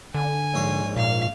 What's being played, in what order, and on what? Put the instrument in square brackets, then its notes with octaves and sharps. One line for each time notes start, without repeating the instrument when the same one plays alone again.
[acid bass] D3 [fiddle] G#5
[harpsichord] A#1 G#2 C#5
[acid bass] A#2 [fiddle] F5